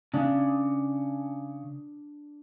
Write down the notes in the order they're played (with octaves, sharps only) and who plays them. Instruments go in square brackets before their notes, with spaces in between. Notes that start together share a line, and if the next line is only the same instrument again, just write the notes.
[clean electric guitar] C#3 [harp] D4